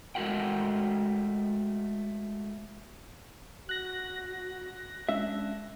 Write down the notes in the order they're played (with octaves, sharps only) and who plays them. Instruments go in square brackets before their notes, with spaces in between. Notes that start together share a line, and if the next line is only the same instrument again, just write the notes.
[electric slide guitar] G#3 A3 F#4 A#4 F#5 G5
[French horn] F#4 [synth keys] F#6 A#6
[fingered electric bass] G#3 C#4 [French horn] D4 [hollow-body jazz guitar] E5